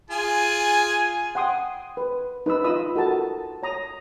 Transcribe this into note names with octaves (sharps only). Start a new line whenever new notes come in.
F4 G#4 G#5
F#5 G5 C6 D#6
B4
D#4 B4 B5 E6
F4 D#5 B5 D#6 E6
F#4 A4 A#4 A5
C#5 A#5 D#6